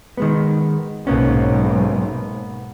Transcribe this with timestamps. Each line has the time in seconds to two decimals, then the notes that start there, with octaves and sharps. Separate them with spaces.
0.17 D#3 G#3 B3
1.07 B1 G#2 A#3 B3 C#4